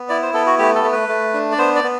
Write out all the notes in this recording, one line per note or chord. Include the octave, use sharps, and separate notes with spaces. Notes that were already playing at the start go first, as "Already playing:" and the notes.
Already playing: B3
E4 D5
C5
B3 A4
F#4
A3 G4
A4
A3
B4
A3
D4
D5
B3 C5
D5
B3